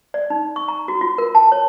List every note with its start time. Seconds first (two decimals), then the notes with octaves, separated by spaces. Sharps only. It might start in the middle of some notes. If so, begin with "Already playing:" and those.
0.14 D5
0.30 D#4
0.56 C#6
0.68 A#5
0.88 F#4
1.01 F4
1.18 A#4
1.35 A5
1.52 C#5